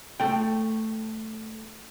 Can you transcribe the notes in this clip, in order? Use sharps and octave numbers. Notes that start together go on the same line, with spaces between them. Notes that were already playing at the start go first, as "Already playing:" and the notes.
A3 G5